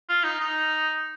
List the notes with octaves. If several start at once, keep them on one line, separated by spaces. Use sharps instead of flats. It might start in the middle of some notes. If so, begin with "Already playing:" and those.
F4
D#4
D#4